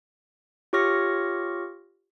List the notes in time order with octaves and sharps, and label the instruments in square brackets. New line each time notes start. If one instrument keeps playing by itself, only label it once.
[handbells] F4 G4 C#5 C#6 F6 A#6